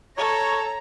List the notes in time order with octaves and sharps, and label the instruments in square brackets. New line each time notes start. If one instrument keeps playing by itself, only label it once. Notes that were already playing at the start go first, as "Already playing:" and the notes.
[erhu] A4 [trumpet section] C#5 [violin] A#5